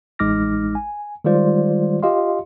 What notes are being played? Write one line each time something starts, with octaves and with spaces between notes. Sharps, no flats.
A1 G#3 D#4 D6 F6 A#6
G#5
D#3 G3 G#3 F4 C5 D5
F4 G4 D#5 F5 C6